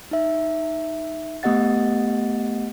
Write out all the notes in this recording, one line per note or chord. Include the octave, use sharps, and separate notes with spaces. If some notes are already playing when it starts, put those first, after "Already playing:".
D#4 E5
A3 B3 G4 D#5 F#5 A6